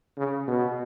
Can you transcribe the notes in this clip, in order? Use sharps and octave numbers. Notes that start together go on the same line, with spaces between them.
C#3
B2